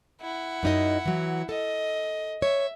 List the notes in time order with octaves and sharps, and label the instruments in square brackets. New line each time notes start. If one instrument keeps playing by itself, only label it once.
[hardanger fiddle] E4 F#5
[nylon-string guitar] F#2 D#4 D#5
E3 F#3
[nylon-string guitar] A4 [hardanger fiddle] D#5
[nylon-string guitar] C#5 [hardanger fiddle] E5